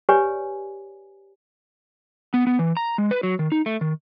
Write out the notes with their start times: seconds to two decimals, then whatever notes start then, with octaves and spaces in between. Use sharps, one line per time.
0.09 G4 B4 C#5 D5 G#5
2.34 B3
2.47 B3
2.59 E3
2.77 A#5
2.98 G#3
3.11 B4
3.23 F#3
3.39 D#3
3.52 D#4
3.66 A3
3.81 D#3